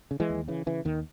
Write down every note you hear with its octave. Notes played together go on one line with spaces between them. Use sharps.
C#3
E3 G#3
D#2
C#3 E3
C#3 E3
D#2 D#3